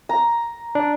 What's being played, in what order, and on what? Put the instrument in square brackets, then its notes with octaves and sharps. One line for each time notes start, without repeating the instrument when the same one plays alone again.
[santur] A#5
[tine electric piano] D4